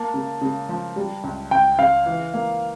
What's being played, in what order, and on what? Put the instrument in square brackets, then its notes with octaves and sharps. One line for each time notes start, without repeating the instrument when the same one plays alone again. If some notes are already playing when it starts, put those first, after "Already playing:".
Already playing: [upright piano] A#3 [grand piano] A5
[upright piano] C#3
C#3
F3
G3
C#2
[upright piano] C#2 [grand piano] G5
[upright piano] C#3 [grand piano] F5
[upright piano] E3
A#3